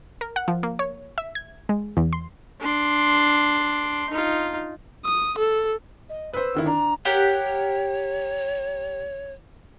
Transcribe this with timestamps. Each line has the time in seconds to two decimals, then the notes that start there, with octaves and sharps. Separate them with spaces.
0.21 A#4
0.36 F#5
0.48 F3
0.63 A#3
0.79 C#5
1.18 E5
1.35 G#6
1.69 G#3
1.97 E2
2.13 C6
2.61 D4 C6
4.10 D#4 F4
5.05 D#6
5.39 A4
6.09 D#5
6.33 B4 C5 E6
6.54 D3 D#3 E4
6.66 D4 A#5
7.05 G4 A#4 C#5 F#5